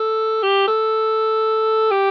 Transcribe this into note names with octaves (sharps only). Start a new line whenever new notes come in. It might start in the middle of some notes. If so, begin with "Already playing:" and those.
Already playing: A4
G4
A4
G4